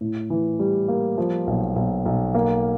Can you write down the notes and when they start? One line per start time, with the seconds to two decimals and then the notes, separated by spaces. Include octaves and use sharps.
0.01 A2
0.30 E3
0.60 G3
0.88 A#3
1.18 F3
1.47 B1
1.76 B1
2.06 B1
2.34 A#3